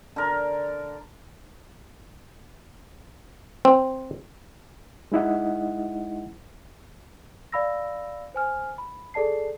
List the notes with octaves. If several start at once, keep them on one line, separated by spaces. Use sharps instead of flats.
D3 A#4
C4
G#3 D#4 E4 D#5 F#5
D5 F5 B5 E6 A#6
C5 G#5 F6
B5
G#4 A4 D5 A5 C7